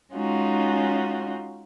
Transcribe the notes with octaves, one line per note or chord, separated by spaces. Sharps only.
G#3 C#4 D#4 F4 F#4